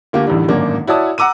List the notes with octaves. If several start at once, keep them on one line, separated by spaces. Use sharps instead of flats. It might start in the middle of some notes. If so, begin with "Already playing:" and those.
D2 A#3 F4 G4
A1 E2 D3 D#3 G3
D1 G#1 F#2 A#3 C#4 D4
E4 F#4 C#5 D5 A5 D#6
F#5 A#5 D6 E6 D#7